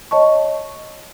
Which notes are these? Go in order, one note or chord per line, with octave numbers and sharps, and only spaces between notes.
C#5 D#5 A5 C#6